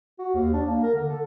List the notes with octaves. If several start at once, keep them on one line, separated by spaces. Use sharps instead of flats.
F#4
D#2
D4
A#3
A#4
D3
A4